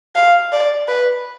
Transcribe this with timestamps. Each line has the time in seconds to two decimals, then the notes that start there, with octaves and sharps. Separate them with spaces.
0.15 F5
0.52 D5
0.88 B4